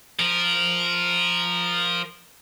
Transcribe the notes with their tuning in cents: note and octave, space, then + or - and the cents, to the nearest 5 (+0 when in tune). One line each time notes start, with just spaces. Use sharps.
F3 +0 A#4 +0